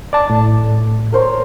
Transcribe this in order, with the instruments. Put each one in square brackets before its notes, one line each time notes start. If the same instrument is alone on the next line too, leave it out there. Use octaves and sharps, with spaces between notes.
[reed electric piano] D5 A5
A2
[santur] A#4 C5 C#5